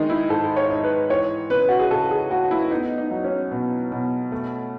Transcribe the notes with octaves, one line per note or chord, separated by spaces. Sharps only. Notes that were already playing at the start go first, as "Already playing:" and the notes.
Already playing: D#3 G#3 D#4
E4
G#2 A4
C#5
D#4
B4
E3 C#5
C#3 B4
F#4
G#4
C#2 A4
G#4
A3 F#4
E4
B3 D#4
D#4
F#3
C#4
B2
B2
A3